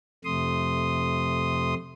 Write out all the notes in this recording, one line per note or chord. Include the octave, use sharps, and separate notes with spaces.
F2 C3 A3 C6 D#6